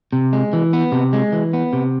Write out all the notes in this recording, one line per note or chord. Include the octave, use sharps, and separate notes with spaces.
C3
G#3
E3
B3
C3
G#3
E3
B3
C3